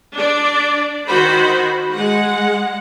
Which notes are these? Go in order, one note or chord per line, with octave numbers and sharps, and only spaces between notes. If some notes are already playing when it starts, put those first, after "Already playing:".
D4 D5
D#3 F#4 C5 B5
G#3 F#5